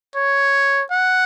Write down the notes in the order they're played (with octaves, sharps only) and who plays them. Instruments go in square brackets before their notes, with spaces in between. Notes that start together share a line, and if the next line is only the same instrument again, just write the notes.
[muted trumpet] C#5
F#5